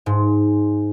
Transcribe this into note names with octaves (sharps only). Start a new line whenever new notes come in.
G#2